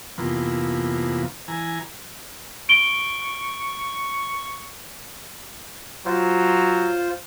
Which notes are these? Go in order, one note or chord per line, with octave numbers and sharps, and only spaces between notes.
F2 C3 E3 F3 A#3 B3
E3 G#5 A#5
C#6 D7 G7
F#3 F4 C5